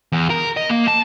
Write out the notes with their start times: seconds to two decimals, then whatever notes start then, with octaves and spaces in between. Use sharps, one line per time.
0.12 E2
0.30 A#4
0.57 D#5
0.69 A#3
0.88 A5